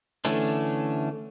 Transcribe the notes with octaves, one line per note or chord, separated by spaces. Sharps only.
D3 E3 A3 C#4 D4